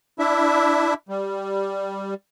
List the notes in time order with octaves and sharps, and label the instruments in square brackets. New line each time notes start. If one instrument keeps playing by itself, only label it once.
[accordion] D4 E4 E5
G3